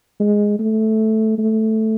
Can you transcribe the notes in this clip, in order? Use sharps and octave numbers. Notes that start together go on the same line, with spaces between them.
G#3
A3
A3